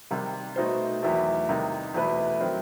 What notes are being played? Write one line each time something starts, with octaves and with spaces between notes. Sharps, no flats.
C3 D#3 G3
B2 A3 D#4 F#4 C5
E2 D#3 F#3 A3 E4
C3 D#3 G3 D#4
E2 B2 A3 E4 B4
D#3 F#3 C4